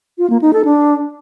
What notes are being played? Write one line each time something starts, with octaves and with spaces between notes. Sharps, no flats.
F4
A#3
D#4
A4
D4